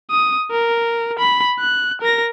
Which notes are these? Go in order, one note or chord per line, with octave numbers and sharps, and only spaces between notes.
D#6
A#4
B5
F#6
A#4 A#6